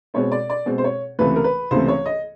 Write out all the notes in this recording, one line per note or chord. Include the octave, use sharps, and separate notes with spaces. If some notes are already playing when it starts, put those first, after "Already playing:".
B2 G#3 C4 C#5
D5
D5
B2 G#3 C4
C5
C#5
C#2 C3 E3 A3 B4
A#4
B4
C#2 C3 E3 A3 C5
C#5
D#5